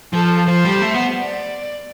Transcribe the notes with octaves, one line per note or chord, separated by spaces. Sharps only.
F3 A4
F3 C5
G3
A3
B3
D5